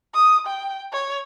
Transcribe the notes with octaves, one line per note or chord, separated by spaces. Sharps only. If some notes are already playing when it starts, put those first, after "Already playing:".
D#6
G5
C#5